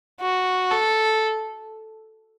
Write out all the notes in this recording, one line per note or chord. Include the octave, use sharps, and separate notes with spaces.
F#4
A4